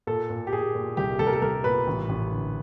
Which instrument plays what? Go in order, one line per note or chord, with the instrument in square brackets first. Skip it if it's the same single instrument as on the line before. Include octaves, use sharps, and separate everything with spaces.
[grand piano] A#2 A4
A#2
G4
A#2 G#4
A#2
C2 G4
C2 A4
A#4
A4
C2 A#4
A#2 B4
A1
A1
D3